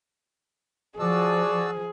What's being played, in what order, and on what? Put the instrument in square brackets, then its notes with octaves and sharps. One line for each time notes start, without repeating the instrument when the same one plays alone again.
[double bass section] F3 [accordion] F#4 A5 E6 [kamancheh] G#4 [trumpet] D5